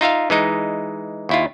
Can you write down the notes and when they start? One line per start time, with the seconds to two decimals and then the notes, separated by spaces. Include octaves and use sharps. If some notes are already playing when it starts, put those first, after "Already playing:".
0.01 D#4 F4 E5 F5
0.30 E3 G#3 D#4
1.29 D#2 E4 F4